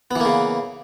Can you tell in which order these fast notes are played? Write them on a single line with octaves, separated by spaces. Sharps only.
B3 E3 A#3 C#3